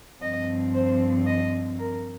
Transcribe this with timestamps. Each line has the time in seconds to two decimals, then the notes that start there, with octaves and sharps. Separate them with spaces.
0.22 G2 F3 C4 D#5
0.74 C5
1.26 D#5
1.79 A#4